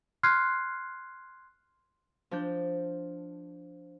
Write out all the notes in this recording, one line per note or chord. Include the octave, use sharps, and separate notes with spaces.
C6 F6 F#6 G#6 C7
F3 D4 G6